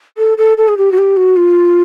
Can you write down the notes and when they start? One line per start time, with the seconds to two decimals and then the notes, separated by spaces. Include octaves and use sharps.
0.18 A4
0.38 A4
0.58 A4
0.68 G#4
0.78 G4
0.92 F#4
0.98 G4
1.17 F#4
1.37 F4